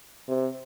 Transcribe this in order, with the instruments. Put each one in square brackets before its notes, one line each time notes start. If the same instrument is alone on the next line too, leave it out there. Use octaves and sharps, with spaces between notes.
[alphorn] C3